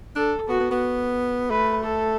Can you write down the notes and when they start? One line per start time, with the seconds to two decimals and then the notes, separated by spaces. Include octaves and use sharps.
0.16 D4 A4
0.49 B3 F#4
0.60 B3
0.71 B3
1.50 A3 B4
1.83 A4